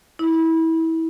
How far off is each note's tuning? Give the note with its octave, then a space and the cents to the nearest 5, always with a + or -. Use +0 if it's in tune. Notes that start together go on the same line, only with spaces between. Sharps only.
E4 -25